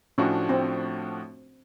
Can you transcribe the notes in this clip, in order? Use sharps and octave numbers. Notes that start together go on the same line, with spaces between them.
A2 F3 A3 C#4 D4 F#4
C4